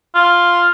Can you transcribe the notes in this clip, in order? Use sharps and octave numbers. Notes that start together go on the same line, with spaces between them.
F4